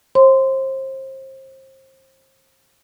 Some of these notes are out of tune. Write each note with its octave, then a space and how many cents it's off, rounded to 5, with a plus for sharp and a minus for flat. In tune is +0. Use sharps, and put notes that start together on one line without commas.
C5 +30 C6 -20